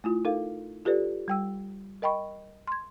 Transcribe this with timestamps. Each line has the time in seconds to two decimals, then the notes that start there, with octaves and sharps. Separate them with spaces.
0.04 A3 E4 F4
0.25 D#4 A4 A#4 F5
0.85 F4 G4 A4 B4 D5
1.28 G3 G5 E6
2.02 A#4 D#5 G5 B5 C#6
2.68 C6 G#6